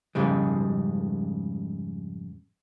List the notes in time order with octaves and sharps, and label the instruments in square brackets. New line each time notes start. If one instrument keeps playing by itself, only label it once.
[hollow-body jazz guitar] F2 G#2 C#3 G3 G#3